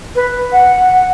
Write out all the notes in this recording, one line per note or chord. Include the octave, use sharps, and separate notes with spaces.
B4
F#5